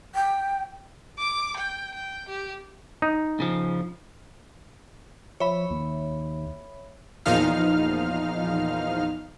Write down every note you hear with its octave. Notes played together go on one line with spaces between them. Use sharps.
G5
D6
G5
G5
G4
D#4
C#3 F3
F3 C#5 E5 B5
D#2
E2 A#2 F3 D#4 F5 F6